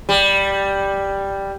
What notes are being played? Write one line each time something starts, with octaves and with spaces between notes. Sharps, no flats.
G3